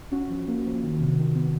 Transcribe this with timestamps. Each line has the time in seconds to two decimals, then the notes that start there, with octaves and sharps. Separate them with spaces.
0.11 C#4 F#4
0.30 F3
0.48 A#3
0.65 F3
0.83 D#3
1.00 C3
1.18 D#3
1.35 B3